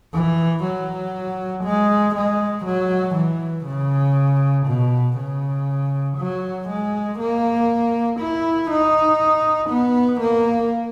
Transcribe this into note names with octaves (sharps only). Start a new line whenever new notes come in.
E3
F#3
G#3
G#3
F#3
E3
C#3
B2
C#3
F#3
G#3
A#3
E4
D#4
B3
A#3